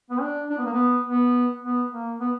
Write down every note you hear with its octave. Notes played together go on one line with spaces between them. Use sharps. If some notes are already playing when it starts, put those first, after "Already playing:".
B3
D4
D4
B3
A#3
B3
B3
B3
A#3
B3